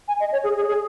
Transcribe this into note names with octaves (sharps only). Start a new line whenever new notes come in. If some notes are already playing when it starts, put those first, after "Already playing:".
G#5
D#5
C#5
G#4
G#4
G#4